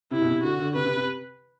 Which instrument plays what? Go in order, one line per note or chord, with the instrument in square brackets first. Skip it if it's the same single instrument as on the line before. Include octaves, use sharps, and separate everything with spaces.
[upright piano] C3 [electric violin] E4
[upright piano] B2
C3
[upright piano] D3 [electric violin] F#4
[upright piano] D3
[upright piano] C3 [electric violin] B4
[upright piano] C3
C3